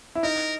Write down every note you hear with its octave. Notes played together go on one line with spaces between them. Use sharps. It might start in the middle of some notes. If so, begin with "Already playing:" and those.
E4
D#4 A#4